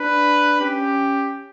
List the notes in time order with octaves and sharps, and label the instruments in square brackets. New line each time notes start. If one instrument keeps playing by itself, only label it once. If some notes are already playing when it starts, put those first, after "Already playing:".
Already playing: [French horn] D4 [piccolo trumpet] B4
[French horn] C#4 [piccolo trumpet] G4